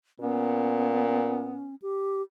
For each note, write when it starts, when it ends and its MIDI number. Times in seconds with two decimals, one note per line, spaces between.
0.20 1.58 46
0.20 1.70 59
0.20 1.75 61
1.82 2.22 67